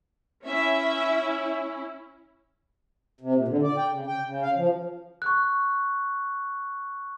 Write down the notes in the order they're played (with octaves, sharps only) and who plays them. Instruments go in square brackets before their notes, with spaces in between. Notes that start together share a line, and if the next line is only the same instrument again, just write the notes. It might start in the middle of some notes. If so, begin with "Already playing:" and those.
[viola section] C#4 E4 [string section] E5
[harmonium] C3
A#2
D3
D5
G5
C#3
G5
C#3
F5
F3
[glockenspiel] C#6 F#6